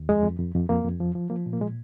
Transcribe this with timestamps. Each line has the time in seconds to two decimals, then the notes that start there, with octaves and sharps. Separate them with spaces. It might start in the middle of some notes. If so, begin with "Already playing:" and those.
Already playing: D#2
0.09 F2 G#3
0.23 F2
0.39 F2
0.55 F2
0.69 F2 A#3
0.84 F2
1.00 F3
1.15 F3
1.30 F3 A#3
1.46 A#2
1.53 A#3
1.60 A#2 G#3